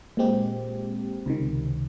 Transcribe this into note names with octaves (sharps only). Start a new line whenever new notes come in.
A#2 G#3 C4 G4
C#2 C3 D#3